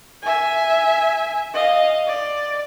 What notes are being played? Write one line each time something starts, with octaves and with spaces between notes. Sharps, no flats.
E5 G#5
D#5 F5
D5